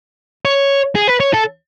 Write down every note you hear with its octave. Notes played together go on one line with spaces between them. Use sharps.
C#5
G#4
B4
C#5
A4